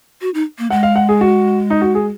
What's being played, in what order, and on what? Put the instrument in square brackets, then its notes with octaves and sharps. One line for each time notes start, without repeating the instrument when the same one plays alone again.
[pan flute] F#4
D#4
A#3
[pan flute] G#3 [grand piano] F#5
[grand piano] F5
F#5
G#4
F#4
D#4
F#4
G#4